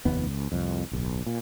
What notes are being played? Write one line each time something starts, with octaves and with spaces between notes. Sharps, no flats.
F1 D#2 B3
C#2
C2 F2
D1 B1
A#2